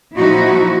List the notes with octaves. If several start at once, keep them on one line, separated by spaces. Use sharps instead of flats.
A#2 F3 D#4 E4 F#4